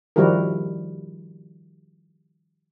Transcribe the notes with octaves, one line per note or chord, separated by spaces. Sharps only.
D#3 F3 G3 E4 F#4 A#4